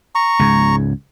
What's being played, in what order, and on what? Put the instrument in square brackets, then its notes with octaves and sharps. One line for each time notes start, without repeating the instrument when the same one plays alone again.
[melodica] A#5 C#6
[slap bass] C#2 G#2